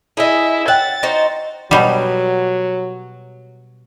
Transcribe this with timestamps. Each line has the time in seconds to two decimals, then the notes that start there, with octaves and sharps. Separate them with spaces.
0.17 E4 G#4 D#5
0.68 C#5 F#5 G5 A6
1.03 D#4 F#4 C5
1.71 B2 F#3 G3